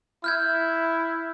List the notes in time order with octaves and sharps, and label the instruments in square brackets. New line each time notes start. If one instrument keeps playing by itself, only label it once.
[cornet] E4 [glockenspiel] F6 G6 G#6